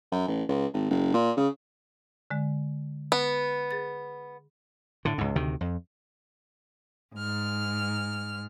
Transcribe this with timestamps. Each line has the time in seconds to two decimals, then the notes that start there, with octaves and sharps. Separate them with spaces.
0.12 F#2
0.28 A1
0.49 C#2
0.73 G#1
0.90 F#1
1.14 A#2
1.37 C#3
2.30 D3 G#3
3.12 B3
3.71 G#4 A6
5.05 A2 D3
5.18 C#2 G#2
5.36 D2 C3 D#3
5.61 F2
7.14 G#2 F6